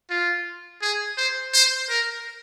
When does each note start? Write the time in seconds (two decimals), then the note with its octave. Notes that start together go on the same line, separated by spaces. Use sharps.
0.10 F4
0.82 G#4
1.17 C5
1.54 C5
1.90 A#4